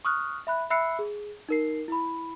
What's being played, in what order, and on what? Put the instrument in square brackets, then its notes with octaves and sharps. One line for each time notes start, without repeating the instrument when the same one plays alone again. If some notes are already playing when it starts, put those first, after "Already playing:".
[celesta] C#6 D#6 F6 F#6
E5 B5 F#6
E5 B5 E6 F#6 C7 C#7
G#4
D#4 A#4 C7
E4 B5